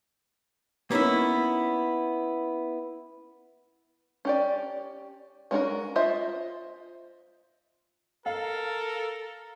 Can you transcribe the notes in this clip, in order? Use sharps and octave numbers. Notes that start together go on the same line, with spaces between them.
A#3 B3 C#4 D#4 E4
C#4 G4 D5
G#3 C#4 F#4 A4 A#4
F4 C5 D#5 E5
A4 A#4 F5